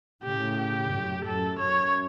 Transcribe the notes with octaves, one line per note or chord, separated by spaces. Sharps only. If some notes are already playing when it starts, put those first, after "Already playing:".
A2 C#3 G4
G4
F#2 A2
F#2 A4
F#2 C#5